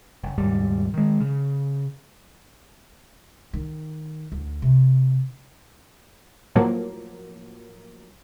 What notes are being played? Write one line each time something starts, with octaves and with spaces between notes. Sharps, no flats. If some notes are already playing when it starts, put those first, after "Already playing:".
F#1
F#1 D#2 G#2 G3
D#3 G#3
C#3
D#3
D2
C3
A2 F3 F#3 A#3